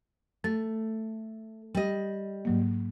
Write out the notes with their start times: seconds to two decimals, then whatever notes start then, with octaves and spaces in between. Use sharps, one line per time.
0.44 A3 A6
1.75 G3 D#5
2.45 G#2 F#3 A#3